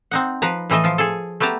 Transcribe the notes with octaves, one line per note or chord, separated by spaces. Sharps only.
C4 D#4 F#5
F3 B4 A#5
A2 E3 A3 D#5 A5
F3 F4
G#4 A4
A3 B3 G4 A5 A#5